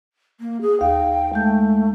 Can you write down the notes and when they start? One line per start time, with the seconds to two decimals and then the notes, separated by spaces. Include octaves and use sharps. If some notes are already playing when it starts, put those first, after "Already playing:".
0.41 A#3
0.62 G#4
0.81 D#2 F5 G5
1.33 G#3 A3 G6